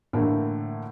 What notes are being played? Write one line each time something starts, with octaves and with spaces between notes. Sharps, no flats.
A2 D3 E3 A3 A#3